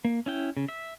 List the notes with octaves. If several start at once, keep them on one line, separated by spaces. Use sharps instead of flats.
A#3
C#4 E4 G5
C#3
E5